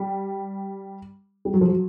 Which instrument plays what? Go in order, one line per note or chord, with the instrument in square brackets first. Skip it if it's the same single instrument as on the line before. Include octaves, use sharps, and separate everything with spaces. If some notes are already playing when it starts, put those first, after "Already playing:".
Already playing: [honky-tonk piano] G3
G3
F#3
F3
F#3